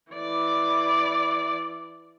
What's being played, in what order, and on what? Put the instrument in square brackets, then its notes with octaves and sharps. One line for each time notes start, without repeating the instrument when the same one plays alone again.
[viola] E3 D5